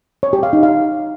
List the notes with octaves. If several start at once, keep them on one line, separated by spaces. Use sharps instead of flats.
C#5
G4
F5
D#4
F5